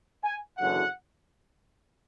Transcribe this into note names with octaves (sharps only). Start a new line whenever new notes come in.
G#5
F#1 E2 D3 F#3 F#5